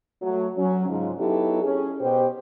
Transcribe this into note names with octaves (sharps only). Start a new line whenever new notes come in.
F#3 A3
F#3 C#4
G#2 C#3 F3
F#3 B3 D#4 E4 G4 A4
C#4 G#4
B2 G4 C5